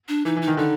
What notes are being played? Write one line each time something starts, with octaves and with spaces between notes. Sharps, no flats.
D4
E3 D#4
E3
D#4
D#3
D3 D#4